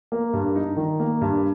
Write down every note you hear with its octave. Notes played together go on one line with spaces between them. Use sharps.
A#3
G2
D#4
D#3
A#3
G2